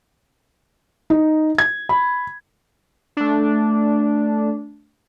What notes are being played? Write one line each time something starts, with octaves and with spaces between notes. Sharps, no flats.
D#4
G#6
B5
A3 D4